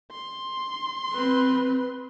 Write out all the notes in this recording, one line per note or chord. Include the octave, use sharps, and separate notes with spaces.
C6
C4 B4